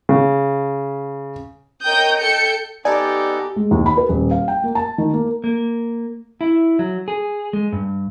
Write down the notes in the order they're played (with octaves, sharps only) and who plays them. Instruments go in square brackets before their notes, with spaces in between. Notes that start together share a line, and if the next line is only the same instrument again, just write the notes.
[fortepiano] C#3
[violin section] A#4 C#5 D#5 G5 D#6 G6
A4 G5 G6 C#7
[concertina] B3 D#4 A4 [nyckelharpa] G4 [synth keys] D5 [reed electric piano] G#5 A5
[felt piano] G#3
D#2
B5
B4
D#1
F5
G5
A#3
A5
D#3
A#3
[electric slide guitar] A#3
E4
F#3
G#4
G#3
G2